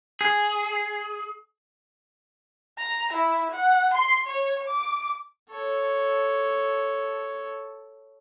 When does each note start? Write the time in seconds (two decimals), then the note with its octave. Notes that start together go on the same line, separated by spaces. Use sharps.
0.21 G#4
2.78 A#5
3.13 E4
3.51 F#5
3.93 C6
4.27 C#5
4.67 D6
5.50 A4 C#5